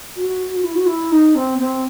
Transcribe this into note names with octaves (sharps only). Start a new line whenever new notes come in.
F#4
E4
F#4
E4
D#4
C4
C4